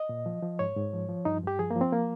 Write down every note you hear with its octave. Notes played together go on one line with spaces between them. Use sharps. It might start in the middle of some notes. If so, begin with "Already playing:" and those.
Already playing: D#5
A#2
F3
F3
G#2 C#5
G#2
F3
F3
G2 D#4
G2 G4
F3 G#4
A#3
F3
C4
A#3